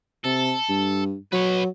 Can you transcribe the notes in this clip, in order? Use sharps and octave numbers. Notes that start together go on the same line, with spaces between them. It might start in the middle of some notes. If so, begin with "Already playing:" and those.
C3 A4
G2
F#3 B4 C#5